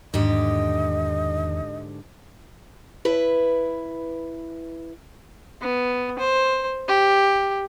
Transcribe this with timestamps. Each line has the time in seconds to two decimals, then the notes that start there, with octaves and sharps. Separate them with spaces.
0.14 E2 G#2 D3 D#3 G4 D#5
3.05 E4 B4
5.61 B3
6.18 C5
6.88 G4